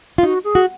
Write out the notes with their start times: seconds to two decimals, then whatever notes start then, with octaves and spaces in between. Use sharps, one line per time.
0.18 F4
0.23 D#4 F#4
0.44 G#4
0.55 F#4